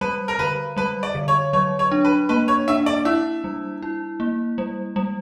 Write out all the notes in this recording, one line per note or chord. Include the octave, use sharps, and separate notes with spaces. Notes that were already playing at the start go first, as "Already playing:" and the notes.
G3 B4
A#4
D3 B4
G3 B4
D5
D3
C#5
F#3 C#5
C#5
D4
B4
A#3 B4
C#5
D4 E5
D5
E4 E5
G3
E4
A#3
G3
G3